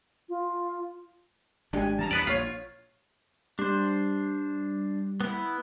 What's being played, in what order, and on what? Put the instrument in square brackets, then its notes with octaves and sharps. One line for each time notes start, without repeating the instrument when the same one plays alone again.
[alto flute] F4
[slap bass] G#1 G#3 A3 [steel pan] D4 G4 G#5
[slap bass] E3 G3 C#4 [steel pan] A5 A#5
[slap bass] E2 G3 [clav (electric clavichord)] B3 B4 D5
[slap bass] A#1 A#3 [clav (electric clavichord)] F4 [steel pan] C#5 F5
[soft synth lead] G3 [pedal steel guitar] D4 C5
[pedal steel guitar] B3 E4